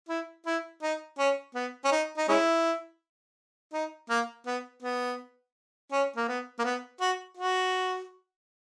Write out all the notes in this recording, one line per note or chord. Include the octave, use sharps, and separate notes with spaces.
E4
E4
D#4
C#4
B3
C#4
D#4
D#4
G#3 C#4 E4
D#4
A#3
B3
B3
C#4
A#3
B3
A#3
B3
F#4
F#4